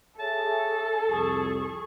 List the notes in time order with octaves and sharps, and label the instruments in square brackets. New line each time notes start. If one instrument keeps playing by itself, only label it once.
[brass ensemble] G#4 C#5 E5 [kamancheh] A4 [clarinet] A5
[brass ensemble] C2 F2 [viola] G#4 C#6